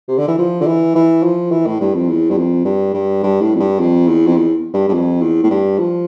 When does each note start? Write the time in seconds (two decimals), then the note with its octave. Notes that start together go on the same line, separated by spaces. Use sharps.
0.08 C3
0.18 D3
0.28 E3
0.38 F3
0.61 D3
0.66 E3
0.95 E3
1.23 F3
1.51 E3
1.66 A2
1.80 G2
1.95 F2
2.09 E2
2.31 G2
2.37 F2
2.65 G2
2.94 G2
3.23 G2
3.41 A2
3.55 F2
3.60 G2
3.80 F2
4.08 E2
4.27 F2
4.36 E2
4.74 G2
4.89 G2
4.94 F2
5.21 E2
5.43 A2
5.50 G2
5.79 F3